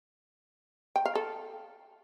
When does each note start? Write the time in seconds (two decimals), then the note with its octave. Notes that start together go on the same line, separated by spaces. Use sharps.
0.96 G5
1.05 F5
1.15 A4